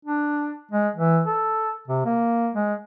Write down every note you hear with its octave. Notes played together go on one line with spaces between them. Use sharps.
D4
G#3
E3
A4
C3
A#3
G#3